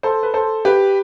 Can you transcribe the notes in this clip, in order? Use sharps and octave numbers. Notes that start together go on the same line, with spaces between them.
A4 C5
B4
A4 C5
G4 B4